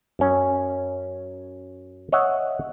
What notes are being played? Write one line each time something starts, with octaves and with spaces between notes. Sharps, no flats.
F#2 C#4
C#5 D#5 E5 F#5